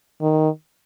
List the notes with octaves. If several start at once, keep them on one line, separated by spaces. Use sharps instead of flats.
D#3